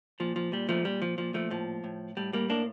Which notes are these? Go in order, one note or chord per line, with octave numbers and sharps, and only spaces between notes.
A#2 F3
F3
A#2 G3
F3 A3
A#2 G3
F3
A#2 F3
F3 A3
A2 F3
A2
A2 G3
G3 A#3
A2 A#3 D4